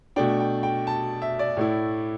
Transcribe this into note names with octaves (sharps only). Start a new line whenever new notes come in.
B2 A3 D4 G5
G5
G5
A5
E5
D5
A2 A3 E4